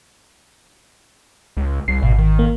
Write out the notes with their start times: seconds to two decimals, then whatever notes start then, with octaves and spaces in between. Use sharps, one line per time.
1.57 C#2
1.88 C2 C7
2.02 G#1 B2
2.18 D#3
2.39 A#3